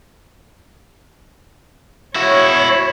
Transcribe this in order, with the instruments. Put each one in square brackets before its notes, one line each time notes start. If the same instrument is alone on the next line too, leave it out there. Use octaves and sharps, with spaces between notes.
[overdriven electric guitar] E4 F#4 [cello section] C#5